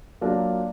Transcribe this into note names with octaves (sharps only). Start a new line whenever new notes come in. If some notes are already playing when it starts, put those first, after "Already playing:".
F#3 A#3 D4 F4